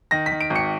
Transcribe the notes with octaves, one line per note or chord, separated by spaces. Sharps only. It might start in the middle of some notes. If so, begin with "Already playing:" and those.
D#3 A#6
B6
D#3
D7
G#1
C#7